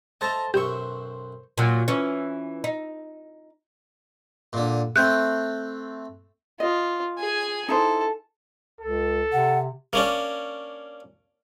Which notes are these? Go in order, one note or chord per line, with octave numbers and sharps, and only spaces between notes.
A4 C5 D#5 E5 A5 A#5
B1 F#2 G4 C5 E5 C#6
A#2 F#3
E3 C#4
D#4
A#2 D3
A3 C4 F#6 G6
F4 D#5
G#4 G#5
D#4 E4 A4 C5
C#2 A4
C3 F#5
A#3 C#4 D4